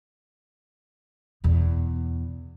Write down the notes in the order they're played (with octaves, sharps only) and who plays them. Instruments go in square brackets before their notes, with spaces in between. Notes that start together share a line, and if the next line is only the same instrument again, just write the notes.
[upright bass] E2 B2